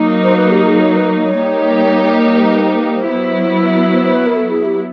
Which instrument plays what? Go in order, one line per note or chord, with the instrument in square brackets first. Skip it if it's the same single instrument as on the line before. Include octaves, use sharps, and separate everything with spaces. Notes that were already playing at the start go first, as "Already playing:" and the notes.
Already playing: [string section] F#3 A#3 D#4
[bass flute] C5
B4
G4
G#4
C#5
B4
C#5
[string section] G3 A#3 D#4 G4
[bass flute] C#5
C5
B4
C5
B4
C5
[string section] F#3 B3 E4
[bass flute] C5
C5
B4
A#4
A4
G#4
G4